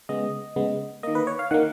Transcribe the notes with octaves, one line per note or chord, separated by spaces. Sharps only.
C#3 G#3 B3 D#5
C#3 G#3 B3
D#3 A#3 D#5
B4
C#5
F5
D#3 A#3 F#5